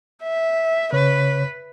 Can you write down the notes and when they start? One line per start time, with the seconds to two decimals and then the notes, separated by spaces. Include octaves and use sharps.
0.23 E5
0.93 C#3 B4 C#5